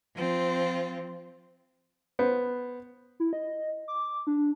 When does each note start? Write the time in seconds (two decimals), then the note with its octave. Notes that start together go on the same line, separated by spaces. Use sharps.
0.15 F3 C4 F4
2.19 B3 C5
3.20 E4
3.33 D#5
3.88 D6
4.27 D4